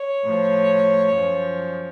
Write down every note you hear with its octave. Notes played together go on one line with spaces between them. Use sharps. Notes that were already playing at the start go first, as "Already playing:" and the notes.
Already playing: C#5
A2 F3
F#2 F3